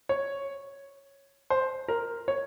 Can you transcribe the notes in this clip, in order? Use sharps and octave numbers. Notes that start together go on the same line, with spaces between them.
C#5
C5
A#4
C#5